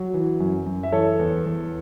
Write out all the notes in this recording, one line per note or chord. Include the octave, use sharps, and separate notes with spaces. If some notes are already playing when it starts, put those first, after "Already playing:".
Already playing: F#3
E3
F#2
F#2
E5
E3 A4 C#5
E2
E2